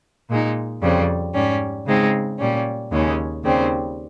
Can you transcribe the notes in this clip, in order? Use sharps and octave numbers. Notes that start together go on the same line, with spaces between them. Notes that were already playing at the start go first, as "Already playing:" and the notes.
A#2 G#3 D#4
F2 C#3 G3 C4
G#2 G3 C#4
C#3 G#3 C4 D#4
A#2 G3 C#4
D#2 C#3 G#3 C#4
D#2 C#3 G3 C4